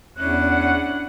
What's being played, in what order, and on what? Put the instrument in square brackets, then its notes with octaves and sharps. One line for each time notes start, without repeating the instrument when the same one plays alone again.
[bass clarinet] E2 [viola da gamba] C#4 D4 E4 [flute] F#6
[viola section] F#5